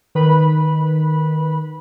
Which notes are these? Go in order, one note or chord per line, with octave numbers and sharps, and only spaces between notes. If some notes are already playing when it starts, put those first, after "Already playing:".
D#3 B4 B5